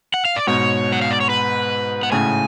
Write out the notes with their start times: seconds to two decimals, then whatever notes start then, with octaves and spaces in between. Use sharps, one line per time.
0.14 F#5
0.25 F5
0.36 D5
0.47 G#2 B2 C#5
0.92 F#5
1.02 F5
1.11 D5
1.20 C#5
1.29 B4
2.03 F#5
2.12 A2 C#3 G#5